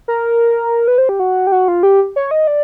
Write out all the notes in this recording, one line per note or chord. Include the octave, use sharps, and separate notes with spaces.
A#4
B4
C5
G4
F#4
G4
F#4
F4
G4
C#5
D#5
D5